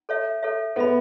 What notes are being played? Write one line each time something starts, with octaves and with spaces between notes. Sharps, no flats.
A4 C#5 E5
A4 C#5 E5
B3 A4 E5 B5